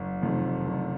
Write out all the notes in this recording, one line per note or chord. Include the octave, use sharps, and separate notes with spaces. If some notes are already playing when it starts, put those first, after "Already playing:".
Already playing: F#1
F2 C3 D#3
F#1